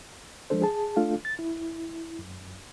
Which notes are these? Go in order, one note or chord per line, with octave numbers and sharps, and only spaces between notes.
F3 G#3 D4 A4 C5
G#4 A5
A3 D4 F4 A4 F5
A6
E4
F#2